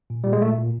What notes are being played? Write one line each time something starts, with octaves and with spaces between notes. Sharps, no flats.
A#2
A#2 G3
G#3
A#2 A3
A#2